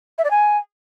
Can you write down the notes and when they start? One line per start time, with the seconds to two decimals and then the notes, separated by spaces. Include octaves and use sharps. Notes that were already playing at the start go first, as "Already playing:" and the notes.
0.18 E5
0.24 D5
0.30 G#5